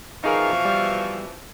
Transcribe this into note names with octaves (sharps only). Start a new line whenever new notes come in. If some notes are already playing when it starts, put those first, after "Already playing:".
B2 E3 F3 D#4 G#4 A#4 F5 C#6
G3